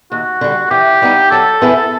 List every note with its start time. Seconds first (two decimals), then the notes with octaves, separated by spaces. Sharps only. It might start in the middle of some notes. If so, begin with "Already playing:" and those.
0.12 D#2 F#4
0.41 D3 G3
0.71 E3 G4
1.02 G3 B3 D#4
1.31 F#3 A4
1.61 B3 E4 G#4 B4